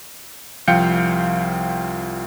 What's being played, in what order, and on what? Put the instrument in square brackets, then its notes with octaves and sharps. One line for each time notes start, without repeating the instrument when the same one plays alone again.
[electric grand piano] C2 F3 F5 G5 G6 C#7